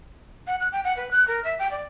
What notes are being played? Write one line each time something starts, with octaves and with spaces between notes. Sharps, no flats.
F#5
F#6
G5
F#5
B4
F#6
A#4
E5
G5
D5